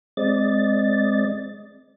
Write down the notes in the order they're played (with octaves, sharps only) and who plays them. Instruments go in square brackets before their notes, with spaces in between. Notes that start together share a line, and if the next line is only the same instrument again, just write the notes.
[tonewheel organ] G#3 C4 D5 D#5 A6